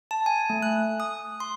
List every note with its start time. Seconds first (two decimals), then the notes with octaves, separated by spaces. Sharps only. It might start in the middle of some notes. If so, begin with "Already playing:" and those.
0.11 A5
0.26 G#5
0.50 A3
0.62 F#6
1.00 D#6
1.40 C6